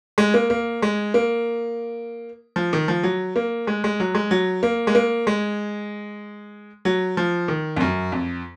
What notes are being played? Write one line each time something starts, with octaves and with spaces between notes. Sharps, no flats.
G#3
A#3
A#3
G#3
A#3
F3
D#3
F3
F#3
A#3
G#3
G#3
F#3
G#3
F#3
A#3
G#3
A#3
G#3
F#3
F3
D#3
F2
F#2
F2